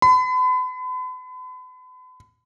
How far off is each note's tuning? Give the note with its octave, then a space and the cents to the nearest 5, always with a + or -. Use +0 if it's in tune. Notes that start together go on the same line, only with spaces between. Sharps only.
B5 +40